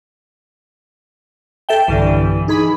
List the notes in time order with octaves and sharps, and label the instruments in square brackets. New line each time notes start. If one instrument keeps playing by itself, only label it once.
[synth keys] A4 E5 G5
[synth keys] B1 G2 D3 [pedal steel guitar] E3
[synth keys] D#4 G#4 B5